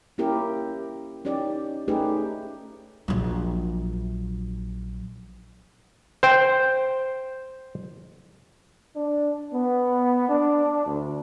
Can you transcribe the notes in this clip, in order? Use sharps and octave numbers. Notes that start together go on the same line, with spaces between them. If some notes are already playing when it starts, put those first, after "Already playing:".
A#3 C#4 E4 G4 A#4
C#4 D#4 G4 D5
A3 C#4 D#4 G4 G#4 B4
A#1 F#3
C5 G5
D4
B3
D4
D2